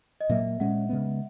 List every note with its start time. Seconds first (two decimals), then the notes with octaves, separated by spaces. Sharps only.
0.21 D#5
0.29 A#2 F#3 A#3 E5
0.60 A#2 G#3 C#4 F#5
0.89 C#3 G#3 B3